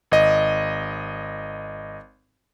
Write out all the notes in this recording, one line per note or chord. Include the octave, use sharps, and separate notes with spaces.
G#1 D#5